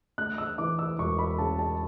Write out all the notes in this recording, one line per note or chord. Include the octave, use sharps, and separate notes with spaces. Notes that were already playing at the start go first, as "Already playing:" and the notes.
D2 F#6
E6
E3 D6
E6
E1 C#6
B5
C#3 A5
A5